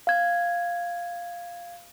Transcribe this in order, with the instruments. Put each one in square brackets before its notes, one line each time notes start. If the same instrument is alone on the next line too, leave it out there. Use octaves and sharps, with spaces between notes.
[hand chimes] F5 G#6